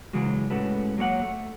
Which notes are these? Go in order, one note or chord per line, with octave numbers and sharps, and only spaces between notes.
C#3 E3 F#3 G#3 F#4
A2 G#3 C#4 F#4 A4 B4
F#3 A#3 C#5 F#5
A3